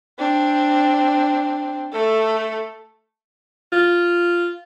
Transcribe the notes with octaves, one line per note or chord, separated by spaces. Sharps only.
C4 D4
A3 A4
F4